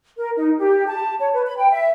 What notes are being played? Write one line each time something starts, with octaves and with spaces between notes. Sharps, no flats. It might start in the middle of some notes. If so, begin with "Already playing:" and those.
A#4
D#4
G4
A5
C#5
B4
B5
G5
E5